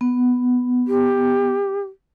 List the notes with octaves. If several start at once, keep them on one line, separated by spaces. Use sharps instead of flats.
B3
G4